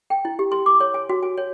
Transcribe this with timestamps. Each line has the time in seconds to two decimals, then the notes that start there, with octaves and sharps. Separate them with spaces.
0.10 G5
0.25 E4
0.39 G4
0.52 C6
0.66 D6
0.80 C#5
0.94 G#5
1.09 F#4
1.23 G#5
1.37 C#5